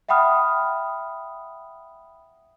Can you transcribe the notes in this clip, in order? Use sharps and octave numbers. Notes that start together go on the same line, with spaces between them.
E5 F#5 G5 B5 D#6 F6